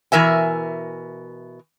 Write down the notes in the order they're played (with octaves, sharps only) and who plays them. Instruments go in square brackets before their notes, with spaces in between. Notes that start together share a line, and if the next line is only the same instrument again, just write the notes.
[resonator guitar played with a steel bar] B2 E3 A#4 E5 G#5